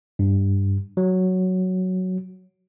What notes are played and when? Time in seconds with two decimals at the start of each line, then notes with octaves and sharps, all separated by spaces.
0.19 G2
0.97 F#3